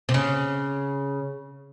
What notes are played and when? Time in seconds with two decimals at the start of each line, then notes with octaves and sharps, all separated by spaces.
0.09 C3
0.14 C#3